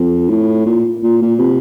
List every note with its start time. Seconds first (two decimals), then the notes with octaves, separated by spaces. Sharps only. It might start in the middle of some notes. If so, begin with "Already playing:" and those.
Already playing: F2
0.29 A2
0.66 A#2
1.03 A#2
1.22 A#2
1.39 C3